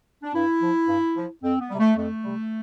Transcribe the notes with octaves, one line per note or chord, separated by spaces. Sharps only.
D4
G2 E4
F3
G2
F3
F2 C4
B3
C3 G3
A3
F2 A3
C3 G3